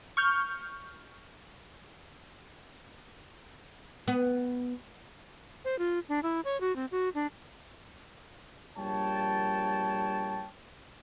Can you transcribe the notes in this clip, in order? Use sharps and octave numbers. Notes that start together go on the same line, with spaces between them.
C#6 F6 G6
B3
C5
F4
D4
E4
C#5
F#4
C4
F#4
D4
A#1 G3 A#4 C#5 G5 A5